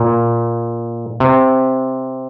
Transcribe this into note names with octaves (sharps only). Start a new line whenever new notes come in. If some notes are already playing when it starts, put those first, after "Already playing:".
Already playing: A#2
C3